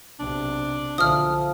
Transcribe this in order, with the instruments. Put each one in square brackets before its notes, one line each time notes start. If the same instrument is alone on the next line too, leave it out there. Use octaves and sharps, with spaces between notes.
[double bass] B1 C3 [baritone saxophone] D4
[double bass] B1 D3 [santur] F3 E5 [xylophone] D#6 F6